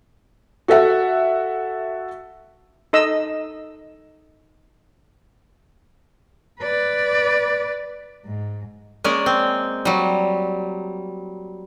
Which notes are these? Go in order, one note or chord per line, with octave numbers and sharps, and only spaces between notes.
F#4 A4 E5 F#5
D#4 A4 D#5 E6
B4 D5
G#2
G#3 A#3 C#4 D5
C4
F#3 G3